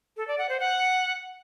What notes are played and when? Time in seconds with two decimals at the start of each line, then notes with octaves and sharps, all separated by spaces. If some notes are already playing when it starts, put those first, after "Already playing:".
0.17 A4
0.28 D5
0.38 F#5
0.49 C5
0.60 F#5